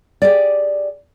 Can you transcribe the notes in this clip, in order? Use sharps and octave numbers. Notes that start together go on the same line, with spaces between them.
G4 G#4 D5